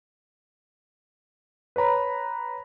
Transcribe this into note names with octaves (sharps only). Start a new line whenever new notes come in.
B4 C#5 A#5 B5